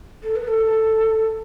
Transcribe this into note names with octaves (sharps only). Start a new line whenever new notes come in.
A4
B4
A4